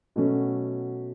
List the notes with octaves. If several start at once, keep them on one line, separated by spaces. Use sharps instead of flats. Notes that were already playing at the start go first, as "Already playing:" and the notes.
B2 F#3 A3 C#4